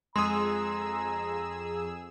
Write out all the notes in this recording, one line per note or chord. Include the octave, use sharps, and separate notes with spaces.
F2 G#3 G#4 A#5 C6 D#6 E6